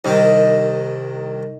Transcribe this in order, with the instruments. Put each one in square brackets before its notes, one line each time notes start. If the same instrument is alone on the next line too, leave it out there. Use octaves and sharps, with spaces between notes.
[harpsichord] C2 D#3 [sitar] D#4